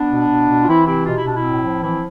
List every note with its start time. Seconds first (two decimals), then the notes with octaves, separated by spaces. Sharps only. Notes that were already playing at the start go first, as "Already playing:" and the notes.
Already playing: B3 D4
0.10 B2
0.29 B2
0.47 B2
0.62 F4
0.67 E3 C4 E4
0.86 C3 C4 E4
1.05 B2 F4
1.16 E4
1.24 B2 D4
1.36 C4 E4
1.43 A2
1.62 F3
1.81 E3 C4 E4